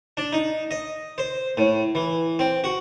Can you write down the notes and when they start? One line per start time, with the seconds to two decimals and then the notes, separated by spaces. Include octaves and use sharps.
0.17 D4
0.33 D#4
0.71 D#5
1.18 C5
1.57 A2
1.95 E3
2.39 C4
2.64 F#4